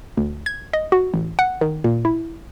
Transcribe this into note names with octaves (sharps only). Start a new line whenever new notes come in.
D2
G#6
D#5
F#4
A1
F#5
D#3
A#2
E4